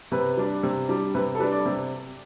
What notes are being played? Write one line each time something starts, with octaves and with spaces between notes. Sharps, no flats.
C3 B4
G3 D4
C3
G3 D4
C3 B4
A4
G3 D4 B4
D5
C3